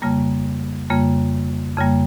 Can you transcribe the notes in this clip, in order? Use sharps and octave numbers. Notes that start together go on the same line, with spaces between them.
F2 C#3 G3 A#3
F2 C#3 G3 A#3
F2 C#3 G3 A#3